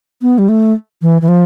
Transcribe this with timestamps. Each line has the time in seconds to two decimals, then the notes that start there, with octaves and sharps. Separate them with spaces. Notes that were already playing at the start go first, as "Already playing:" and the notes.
0.22 B3
0.38 G3
0.49 A3
1.02 E3
1.22 E3
1.28 F3